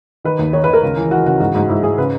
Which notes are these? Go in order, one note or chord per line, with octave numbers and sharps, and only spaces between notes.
D#3 B4
D#2
D#3 C#5
D#3 B4
A#4
C#2
E3
E3 F#4
C#3 F#4
G#2 F#4
G#2 F#4
G#2 E4
G#2 G#4
C#3 B4